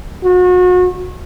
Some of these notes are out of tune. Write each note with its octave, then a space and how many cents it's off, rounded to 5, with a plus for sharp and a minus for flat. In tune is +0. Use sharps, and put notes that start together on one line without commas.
F#4 -35